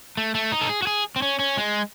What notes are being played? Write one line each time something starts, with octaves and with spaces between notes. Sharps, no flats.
A3
A3
D#4
A4
G#4
F#4
G#4
C4
C#4
C#4
G#3